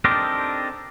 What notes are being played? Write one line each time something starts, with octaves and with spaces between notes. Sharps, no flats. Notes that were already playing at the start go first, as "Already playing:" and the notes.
C4 D4 D#4 G4 A4 A#4